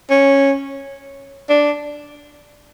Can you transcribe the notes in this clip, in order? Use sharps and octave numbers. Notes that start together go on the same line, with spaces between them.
C#4
D4